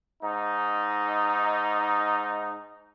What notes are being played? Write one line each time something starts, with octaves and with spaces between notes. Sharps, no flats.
G#2 D#4